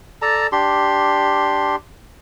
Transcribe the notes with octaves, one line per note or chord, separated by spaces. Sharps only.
A4 D5 A5 A#5
D4 G4 C6